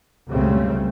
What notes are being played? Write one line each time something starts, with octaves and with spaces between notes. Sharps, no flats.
C#2 F#2 C#3 G3 A3 C4